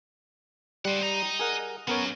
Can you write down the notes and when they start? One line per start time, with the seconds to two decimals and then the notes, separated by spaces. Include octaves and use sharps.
0.85 G3 C5 F#5
1.02 D#5 A#5
1.39 G#4 A#4 F#5
1.88 B3 C#4 F#4 A#4 C#5